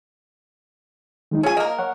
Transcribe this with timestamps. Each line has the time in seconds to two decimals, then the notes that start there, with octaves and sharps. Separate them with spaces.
1.31 D#3 G#3 D#4
1.43 C#4 F4 G#4 G#5
1.57 A#3 A#4 D#5
1.79 C#5 F#5